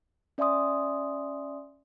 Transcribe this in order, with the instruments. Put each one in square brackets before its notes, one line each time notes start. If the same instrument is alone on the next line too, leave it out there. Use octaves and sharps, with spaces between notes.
[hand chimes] C#4 D5 E5 G#5 C6 D#6